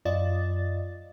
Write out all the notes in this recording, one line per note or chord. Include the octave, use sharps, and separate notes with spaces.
F#2 F4 D5 D#5 A6